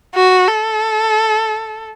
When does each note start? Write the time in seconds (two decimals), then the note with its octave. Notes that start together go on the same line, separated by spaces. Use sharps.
0.15 F#4
0.48 A4